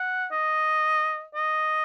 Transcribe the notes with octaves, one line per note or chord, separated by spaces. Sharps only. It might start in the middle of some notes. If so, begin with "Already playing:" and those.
Already playing: F#5
D#5
D#5